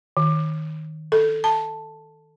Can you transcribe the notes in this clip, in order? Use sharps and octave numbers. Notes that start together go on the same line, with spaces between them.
D#3
A4
A5